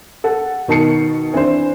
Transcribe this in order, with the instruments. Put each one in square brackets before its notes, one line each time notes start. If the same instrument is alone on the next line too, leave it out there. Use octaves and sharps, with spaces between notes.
[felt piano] A4 F#5
B2 D#3 A5 C7 C#7
E3 C4 D4 C5